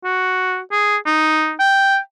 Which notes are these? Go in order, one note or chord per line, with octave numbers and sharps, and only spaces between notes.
F#4
G#4
D#4
G5